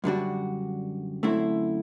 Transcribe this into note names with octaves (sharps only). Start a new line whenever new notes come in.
F#2 D3 G3 D4 F#4
F#2 D3 A3 C4 E4